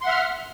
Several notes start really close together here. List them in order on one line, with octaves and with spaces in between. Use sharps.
C6 F#5 E5 F6